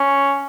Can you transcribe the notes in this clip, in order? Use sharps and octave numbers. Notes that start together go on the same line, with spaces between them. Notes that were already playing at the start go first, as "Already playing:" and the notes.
Already playing: C#4